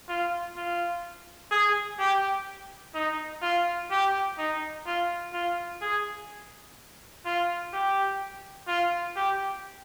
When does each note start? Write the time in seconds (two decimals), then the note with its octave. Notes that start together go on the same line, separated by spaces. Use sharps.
0.09 F4
0.57 F4
1.51 G#4
1.99 G4
2.95 D#4
3.42 F4
3.91 G4
4.38 D#4
4.86 F4
5.33 F4
5.82 G#4
7.26 F4
7.73 G4
8.68 F4
9.16 G4